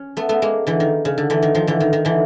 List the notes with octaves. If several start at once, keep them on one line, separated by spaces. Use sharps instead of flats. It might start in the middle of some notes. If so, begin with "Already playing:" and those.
Already playing: C#4
A3 B3
A3 B3
G#3 A#3
D3 E3
D#3
C#3
D3
D3 E3
D#3
D#3 F3
D3 E3
D#3
D#3
D3 E3